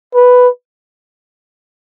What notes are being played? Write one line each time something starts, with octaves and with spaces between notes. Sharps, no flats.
B4